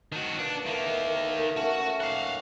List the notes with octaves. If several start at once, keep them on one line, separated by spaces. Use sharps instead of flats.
D#3 F#4 A5
B2 A#3 D4
D#3 A#3 E4 A4 A#4
A3
A3 C#4 F#4
D#3 F#3 A#3 F5 F#5